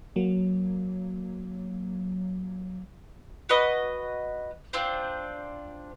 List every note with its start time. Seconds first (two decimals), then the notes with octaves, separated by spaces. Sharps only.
0.16 F#3 A#3
3.49 F#4 B4 D#5
4.73 C4 D4 F4 C5